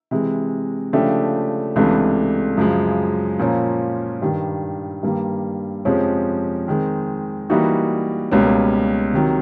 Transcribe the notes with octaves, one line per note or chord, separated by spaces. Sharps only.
C3 E3 G#3
C#3 F3 A3 D4 G4
C#2 C3 E3 A3 D4
F#2 C#3 F3 G#3
A#2 F3 A#3 C#4
G2 D#3 G3
G2 D#3 G3 A#3
F2 C3 F3 G#3 C#4
D#3 G#3 C4
E3 G3 A#3 D#4 F#4
C#2 B2 G3 A#3 C#4
C3 D#3 F#3